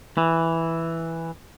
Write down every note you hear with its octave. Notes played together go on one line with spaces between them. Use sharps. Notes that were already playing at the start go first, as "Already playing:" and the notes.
E3